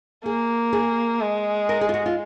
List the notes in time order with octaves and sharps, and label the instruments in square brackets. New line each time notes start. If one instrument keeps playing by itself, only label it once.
[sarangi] A#3 [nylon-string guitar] G#4
[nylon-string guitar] G#4
[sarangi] G#3
[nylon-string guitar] A#4
G#4
F4
F#4
F4